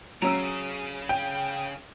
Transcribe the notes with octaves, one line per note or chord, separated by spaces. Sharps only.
C#3 F#3 C#4 A#5 E6
G5